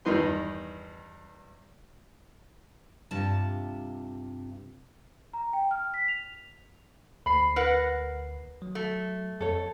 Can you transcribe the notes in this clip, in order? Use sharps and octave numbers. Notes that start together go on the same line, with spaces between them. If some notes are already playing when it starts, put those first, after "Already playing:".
E2 G2 D#3 D#4 B4 C6
G2 C3 F4 A5
A#5
G5
F6
B6
F7
D2 B5 C7
A#4 B4 F#5
F#3
A3
F2 A4 C#5